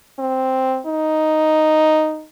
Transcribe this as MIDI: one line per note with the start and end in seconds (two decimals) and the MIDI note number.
0.19 0.80 60
0.86 2.25 63